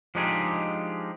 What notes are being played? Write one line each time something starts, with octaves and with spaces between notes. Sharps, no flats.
F3 G#3 D4 D#4 G4 G#4